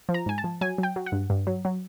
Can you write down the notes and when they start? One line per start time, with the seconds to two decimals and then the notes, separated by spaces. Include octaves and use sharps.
0.09 F3
0.14 A#5
0.26 G#2 G#5
0.38 A5
0.44 F3
0.61 F#3 G#5
0.78 F#3 G5
0.96 F#3
1.06 F#5
1.12 G2
1.30 G2
1.47 F#3
1.65 F#3